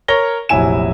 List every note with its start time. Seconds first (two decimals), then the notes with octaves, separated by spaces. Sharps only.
0.08 A#4 C#5 A#6 G7
0.49 F1 A#1 F#3 E4 G#5 E7